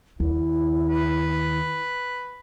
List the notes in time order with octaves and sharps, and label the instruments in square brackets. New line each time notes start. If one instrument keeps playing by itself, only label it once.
[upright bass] D#2 [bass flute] E4
[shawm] B4